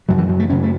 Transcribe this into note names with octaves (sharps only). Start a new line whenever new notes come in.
F#2 C#3 F#3
E3
F#3
A3
F#2 C#3 C#4
A3